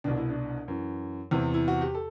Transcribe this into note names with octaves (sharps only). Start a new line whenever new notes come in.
C2 B2 D4
E4
D4
F#2 E3
E2 C3 E3 E4
E4
F#4
G4
A4